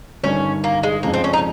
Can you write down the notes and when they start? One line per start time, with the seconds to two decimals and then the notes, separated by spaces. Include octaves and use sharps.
0.23 G1 G2 D#3 C#4
0.64 A#3
0.83 G#3
1.03 F2 C#3 F3 G#3 A#3
1.14 C4
1.24 C#4
1.33 D#4